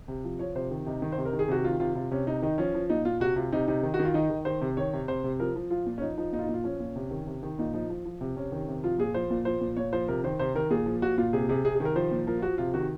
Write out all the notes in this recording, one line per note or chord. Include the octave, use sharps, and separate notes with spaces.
C3
F3
F3 C#5
C3 C5
D#3
C3 D#4
D#3
C5
C3
A#4
D#3
G#4
C3 F#4
D#3 F4
C3 F4
C3 F4
C3 C#4
C3 D#4
D#3 D#4
F3 C#4
F3
A#2 D#4
A#2 F4
C3 F#4
C3 F4
C3 D#4
C3 D#4
D#3
F#4
D#3
F4
D#3 D#4
D#3
D#3 C5
C3
D#3 C#5
C3
C3 C5
C3
F3 A#4
F3
F3 F4
A#2
C#4
F3 D#4
F3 D#4
A#2 D#4
F4
D#4
A#2 F4
F3 C#4
A#2
C3
D#3
C3
D#3
A#2 D#4
F3 D#4
F3
F3
C3
C3 C#4
D#3
C3
F3 F4
A#2 G#4
F3 C5
A#2
F3 C5
A#2
A#2 C#5
F3 C5
C3 A#4
D#3 C5
C3 C5
D#3 A#4
A#2 G#4
F3
A#2 F#4
A#2 F4
C3 G#4
C3 G#4
C3 G#4
G#4
D#3
A#4
F3 C5
A#2
F3 A#4
F4
F3 F#4
C3 F4
D#3 F#4